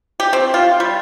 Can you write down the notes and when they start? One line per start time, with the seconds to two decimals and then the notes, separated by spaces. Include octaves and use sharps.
0.20 G4
0.33 C4
0.54 F4
0.80 G3